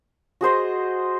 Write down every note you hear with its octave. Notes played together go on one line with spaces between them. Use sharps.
F#4 G#4 C5 D#5